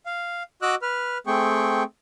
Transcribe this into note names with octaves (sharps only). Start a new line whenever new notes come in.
F5
F#4 D#5 D6 E6 F#6
B4 F6
A3 C4 G#4 G5 C#6